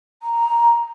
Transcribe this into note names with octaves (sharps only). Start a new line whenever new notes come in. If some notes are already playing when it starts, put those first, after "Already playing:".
A#5